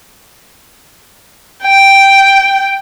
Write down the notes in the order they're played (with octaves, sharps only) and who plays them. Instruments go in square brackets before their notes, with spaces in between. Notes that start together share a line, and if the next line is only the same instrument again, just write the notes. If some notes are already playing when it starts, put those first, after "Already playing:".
[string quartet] G5